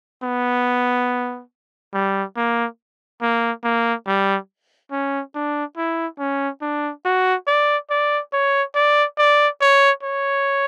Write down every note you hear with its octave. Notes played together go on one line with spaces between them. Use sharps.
B3
G3
A#3
A#3
A#3
G3
C#4
D4
E4
C#4
D4
F#4
D5
D5
C#5
D5
D5
C#5
C#5